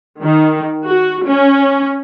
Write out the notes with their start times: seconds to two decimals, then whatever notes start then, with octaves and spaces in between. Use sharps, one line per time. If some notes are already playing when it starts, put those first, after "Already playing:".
0.21 D#3
0.85 F#4
1.27 C#4